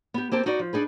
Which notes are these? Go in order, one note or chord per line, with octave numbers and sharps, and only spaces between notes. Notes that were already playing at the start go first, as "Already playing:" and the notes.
B3 G4
A#3 C4 G4 A5
D#4 F#4 B4 D5
F3
D4 D#4 G#4 B4